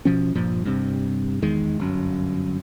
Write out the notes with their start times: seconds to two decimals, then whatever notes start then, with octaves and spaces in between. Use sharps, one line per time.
0.05 B2 F3 C#4
0.36 G2 A#2 F3
0.65 G2 C3
1.42 E2 D#3 G#3
1.79 G1 F#2